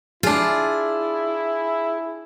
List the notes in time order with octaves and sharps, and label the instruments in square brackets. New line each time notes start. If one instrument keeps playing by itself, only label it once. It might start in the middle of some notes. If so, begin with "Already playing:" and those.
[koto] D4 F4 [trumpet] E4 [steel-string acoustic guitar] G#4